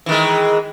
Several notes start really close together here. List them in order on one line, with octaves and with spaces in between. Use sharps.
E3 D#3 G#3